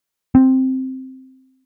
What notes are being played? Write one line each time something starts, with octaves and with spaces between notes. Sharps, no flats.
C4